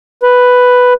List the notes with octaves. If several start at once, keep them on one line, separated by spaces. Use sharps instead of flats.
B4